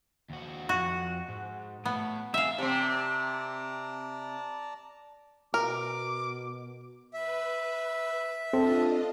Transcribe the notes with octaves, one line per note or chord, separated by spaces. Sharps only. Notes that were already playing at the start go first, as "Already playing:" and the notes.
D#2 F#4
F2 F#4
G#2
A2 B3
C4 G#4 E5 F5
C3 C4 D5 A5 A#5
B2 A#4 D6
B4 E5
C4 D4 F4 A4 D#5